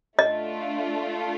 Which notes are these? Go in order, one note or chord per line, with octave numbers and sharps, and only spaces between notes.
A3 D4 F4 D#5